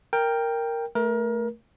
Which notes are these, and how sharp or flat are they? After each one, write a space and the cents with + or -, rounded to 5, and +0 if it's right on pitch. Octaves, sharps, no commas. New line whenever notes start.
A#4 -5 G5 +10
A3 +0 A#4 +25